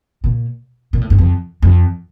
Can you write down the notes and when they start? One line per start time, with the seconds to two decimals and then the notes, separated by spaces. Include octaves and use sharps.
0.24 A#2
0.93 A#2
1.01 A2
1.10 G2
1.19 F2
1.62 F2